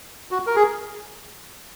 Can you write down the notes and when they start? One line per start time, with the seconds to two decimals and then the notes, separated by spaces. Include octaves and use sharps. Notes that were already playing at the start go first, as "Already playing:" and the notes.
0.31 F#4
0.47 A#4
0.56 G#4